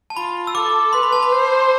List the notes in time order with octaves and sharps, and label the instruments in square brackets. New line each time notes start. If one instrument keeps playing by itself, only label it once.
[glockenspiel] A5
[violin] F4 [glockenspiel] B5
[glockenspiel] E6
[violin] A4 [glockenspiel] D6
[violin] B4 [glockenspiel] C6
[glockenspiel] B5
A5
B5
[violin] C5